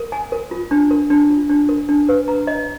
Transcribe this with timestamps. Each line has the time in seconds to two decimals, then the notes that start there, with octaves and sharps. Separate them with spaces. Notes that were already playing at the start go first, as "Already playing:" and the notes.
Already playing: A#4
0.12 G#5
0.32 A#4
0.51 F4
0.71 D4
0.91 A#4
1.10 D4
1.30 F4
1.50 D4
1.69 A#4
1.89 D4
2.09 B4
2.28 A#5
2.47 D#5